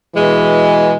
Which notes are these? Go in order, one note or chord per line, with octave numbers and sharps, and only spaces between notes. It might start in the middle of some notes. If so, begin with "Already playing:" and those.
B2 E3 G#3